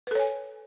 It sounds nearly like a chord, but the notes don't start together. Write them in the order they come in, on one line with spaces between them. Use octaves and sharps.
B4 A4 C#5 G#5